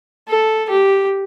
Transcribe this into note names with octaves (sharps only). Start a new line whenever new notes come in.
A4
G4